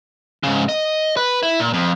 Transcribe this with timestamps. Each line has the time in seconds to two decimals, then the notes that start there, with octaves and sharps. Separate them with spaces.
0.43 G#2 C#3
0.69 D#5
1.17 B4
1.43 E4
1.60 A#2
1.74 F2